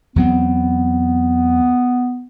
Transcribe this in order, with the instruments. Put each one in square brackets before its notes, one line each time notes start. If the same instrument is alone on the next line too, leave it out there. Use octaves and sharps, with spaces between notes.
[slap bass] E2 F#3 C4 [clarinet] B3